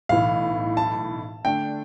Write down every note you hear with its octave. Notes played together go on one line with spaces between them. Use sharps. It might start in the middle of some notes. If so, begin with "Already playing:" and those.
B1 A2 E3 F5
A5
D3 A3 D4 G5